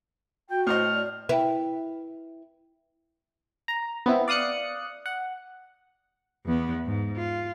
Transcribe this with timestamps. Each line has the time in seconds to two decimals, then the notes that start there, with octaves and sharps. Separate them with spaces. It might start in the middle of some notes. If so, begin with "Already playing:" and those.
0.50 F#4 G5
0.67 A2 C5 D#5 F6
0.94 D5
1.29 E4 B4 E5 G5
3.68 A#5
4.06 B3 C4 E4
4.28 D5 F5 D#6 F#6 C#7
5.06 F#5
6.45 E2 B3
6.86 G#2
7.16 F4